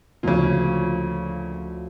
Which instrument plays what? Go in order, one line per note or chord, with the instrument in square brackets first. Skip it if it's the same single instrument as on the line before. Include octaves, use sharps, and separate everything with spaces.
[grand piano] D2 F3 [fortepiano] A#2 C#3